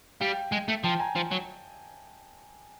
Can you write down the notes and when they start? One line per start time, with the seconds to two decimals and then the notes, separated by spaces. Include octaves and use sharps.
0.21 G3 F5 G5
0.52 G#3
0.68 A3
0.84 F3 G5 A5
0.99 G#5 A#5
1.15 F3
1.31 F#3